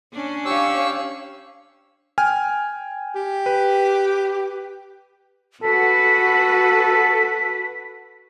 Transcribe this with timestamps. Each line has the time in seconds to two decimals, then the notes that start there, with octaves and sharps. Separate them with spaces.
0.13 C#4 D4
0.45 G4 C#5 F5 C#6 E6
2.18 G5 G#5 F6
3.15 G4
3.46 B4
5.63 F#4 A4 B4 B6